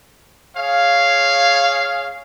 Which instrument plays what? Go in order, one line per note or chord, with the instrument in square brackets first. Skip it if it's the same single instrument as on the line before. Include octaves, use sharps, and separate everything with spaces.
[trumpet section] G#4 C#5 F5